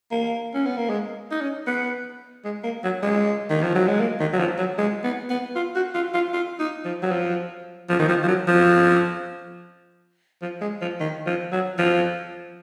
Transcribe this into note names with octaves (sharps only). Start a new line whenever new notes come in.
A#3
C#4
B3
A#3
G#3
D#4
C#4
B3
G#3
A#3
F#3
G#3
D#3
F3
F#3
G#3
A#3
D#3
F#3
F3
F#3
G#3
B3
B3
F4
F#4
F4
F4
F4
D#4
F3
F#3
F3
F3
D#3
F3
F3
F#3
F3
F3
G#3
F3
D#3
F3
F#3
F3